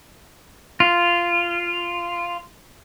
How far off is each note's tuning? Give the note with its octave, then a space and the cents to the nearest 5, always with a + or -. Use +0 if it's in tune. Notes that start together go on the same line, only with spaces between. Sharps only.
F4 -10